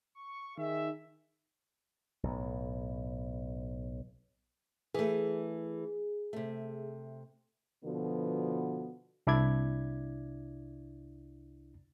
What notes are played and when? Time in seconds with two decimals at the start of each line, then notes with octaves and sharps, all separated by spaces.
0.15 C#6
0.58 D#3 G#4 E5
2.23 B1 A2
4.94 E3 A3 G#4
6.33 C3 A3
7.83 B2 D3 F3 B3 F#4
9.27 C2 D4 E4 D5 G#6